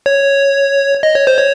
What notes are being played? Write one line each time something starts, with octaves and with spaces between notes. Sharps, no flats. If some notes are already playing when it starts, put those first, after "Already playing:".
C#5
D#5
C#5
C5
C#5